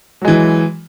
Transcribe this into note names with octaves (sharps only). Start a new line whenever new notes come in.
E3 F#3 G#3